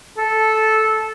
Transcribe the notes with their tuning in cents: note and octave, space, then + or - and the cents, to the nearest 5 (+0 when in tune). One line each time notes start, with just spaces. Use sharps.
A4 -10